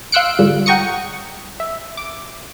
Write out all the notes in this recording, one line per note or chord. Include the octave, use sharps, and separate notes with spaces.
F5 C6 E6 F#6 C#7 D7
G#2 D3 G3 F4
F#5 G5 A#5 C#6 D#6 C#7
E5
D6